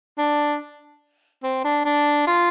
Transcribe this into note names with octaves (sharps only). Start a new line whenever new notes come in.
D4
C4
D4
D4
F4